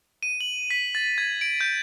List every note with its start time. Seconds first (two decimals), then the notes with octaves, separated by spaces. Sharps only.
0.23 D#7
0.41 F#7
0.71 B6
0.95 A6
1.18 G#6
1.41 D7
1.61 G6